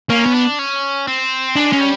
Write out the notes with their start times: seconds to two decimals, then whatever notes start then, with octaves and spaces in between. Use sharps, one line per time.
0.10 A#3 C#4
0.26 B3
0.34 D4
0.59 C#4
1.07 C4
1.56 G#3 D4
1.73 C#4
1.80 G3